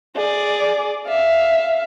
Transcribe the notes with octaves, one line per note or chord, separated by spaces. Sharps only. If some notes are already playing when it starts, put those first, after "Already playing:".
G#4 D5
E5 F5